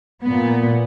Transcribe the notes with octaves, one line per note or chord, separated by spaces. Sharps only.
A#2 B3